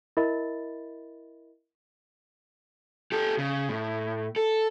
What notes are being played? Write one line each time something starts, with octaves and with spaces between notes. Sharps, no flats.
E4 A#4 D#5 E5 B5 A6
G4 A4
C#3
A2
A4